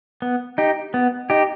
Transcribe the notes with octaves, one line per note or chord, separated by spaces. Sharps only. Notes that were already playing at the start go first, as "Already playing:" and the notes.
B3
D#4 G4
B3
D#4 G4